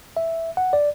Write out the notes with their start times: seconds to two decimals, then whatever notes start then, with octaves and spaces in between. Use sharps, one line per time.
0.17 E5
0.57 F#5
0.73 D5